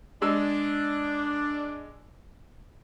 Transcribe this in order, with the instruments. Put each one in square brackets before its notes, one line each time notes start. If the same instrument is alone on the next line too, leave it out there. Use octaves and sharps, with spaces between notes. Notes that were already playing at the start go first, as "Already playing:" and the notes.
[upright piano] G#3 E6 [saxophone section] D4